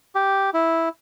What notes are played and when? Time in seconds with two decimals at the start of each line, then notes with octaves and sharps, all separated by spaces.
0.15 G4
0.54 E4